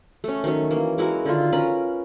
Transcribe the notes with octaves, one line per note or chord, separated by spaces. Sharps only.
A3 C#4
D#3 F#3 C#4
E3 A#3
G#3 E4 F#4 A#4
D3 D#3 F4
C#4 A#4 B4 B5